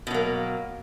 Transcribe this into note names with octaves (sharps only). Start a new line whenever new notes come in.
B2 F#3 A#3